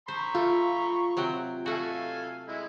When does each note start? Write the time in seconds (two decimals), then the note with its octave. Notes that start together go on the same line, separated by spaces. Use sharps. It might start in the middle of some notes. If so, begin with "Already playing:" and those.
0.08 C5 A#5 B5 C#6
0.35 A3 F4
1.17 C3 F#3 G5
1.66 A3 F#4 A4 F5 G#5
2.48 G#3 E4